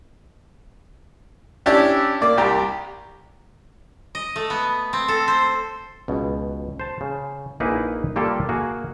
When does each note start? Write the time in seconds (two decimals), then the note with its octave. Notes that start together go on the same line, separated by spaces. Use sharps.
1.66 C#4 D4 E4 G4 D5
2.22 A#3 D5 D6
2.38 C2 G4 A#5
4.15 D#5
4.36 A3
4.50 B3
4.93 C4
5.08 A4
5.28 C5
6.08 C#2 B2
6.80 C5 A5
7.01 C#3
7.60 A#1 A#3 D#4 E4 G#4 B4
8.16 G3 A#3 F4 G4 A4
8.49 A#3 F#4 G#4